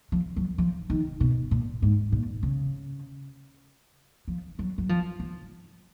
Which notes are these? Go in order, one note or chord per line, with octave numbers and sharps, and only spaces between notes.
F3
F#3
F3
D#3
B2
A#2
G#2
A#2
C#3
F3
F#3
F#3
F3
F3